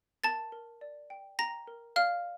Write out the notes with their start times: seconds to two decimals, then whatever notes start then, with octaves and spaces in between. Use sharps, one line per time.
0.24 A#4 A5 A6
0.52 A#4
0.81 D5
1.10 G5
1.39 G5 A#5 A#6
1.67 A#4
1.96 D5 F5 F6